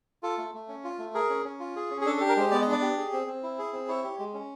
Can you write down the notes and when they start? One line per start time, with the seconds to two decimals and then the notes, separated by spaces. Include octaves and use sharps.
0.23 F4 A4
0.38 A3
0.54 A3
0.68 C#4
0.84 F4
0.99 A3
1.15 G#4 A#4
1.30 C#4
1.45 C#4
1.60 F4
1.76 G#4
1.91 C#4
2.01 G#4
2.06 D4 A4
2.17 A4
2.20 G4
2.29 A#4
2.37 G#3 C5
2.51 B3 D5
2.62 D#5
2.67 D4
2.72 D5
2.82 G4
2.97 G#4
3.13 C4
3.27 C4
3.43 E4
3.59 G#4
3.73 C4
3.88 E4 C#5
4.04 G4
4.19 G#3
4.34 C#4